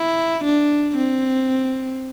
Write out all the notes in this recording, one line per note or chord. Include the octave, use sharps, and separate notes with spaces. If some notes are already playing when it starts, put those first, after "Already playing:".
Already playing: E4
D4
C4